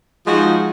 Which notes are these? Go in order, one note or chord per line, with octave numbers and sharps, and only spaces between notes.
F3 G#3 D#4 F#4